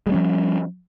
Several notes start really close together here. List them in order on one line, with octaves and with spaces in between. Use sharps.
G#3 G3 C#4 F3